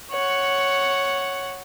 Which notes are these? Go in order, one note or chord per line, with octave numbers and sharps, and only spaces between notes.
C#5 F#5